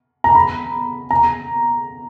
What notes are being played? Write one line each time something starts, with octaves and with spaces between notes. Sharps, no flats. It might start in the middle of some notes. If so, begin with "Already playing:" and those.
A#5
B5
A#5